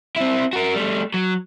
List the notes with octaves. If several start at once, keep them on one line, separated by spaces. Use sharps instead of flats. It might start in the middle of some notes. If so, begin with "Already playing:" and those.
C4 E4
F#4 A#4
G3 A3
F#3